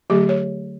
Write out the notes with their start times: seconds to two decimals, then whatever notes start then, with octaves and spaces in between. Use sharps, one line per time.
0.10 D3 F#3 A3 G4
0.29 C#5